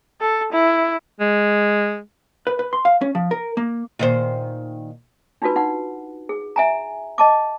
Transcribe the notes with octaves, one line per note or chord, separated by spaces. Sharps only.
A4
E4
G#3
B4
B4
C6
F5
C#4
F3
A#4
A#3
A#2 D#3 C5
D4 D#4 F4 F#4 B4
D#4 F#5
G#4
E5 G#5 A#5
D#5 A5 D6